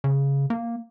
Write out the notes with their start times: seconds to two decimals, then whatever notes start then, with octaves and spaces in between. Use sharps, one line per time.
0.04 C#3
0.50 A#3